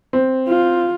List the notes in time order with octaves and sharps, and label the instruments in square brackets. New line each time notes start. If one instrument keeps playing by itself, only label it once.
[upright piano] C4
[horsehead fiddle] F4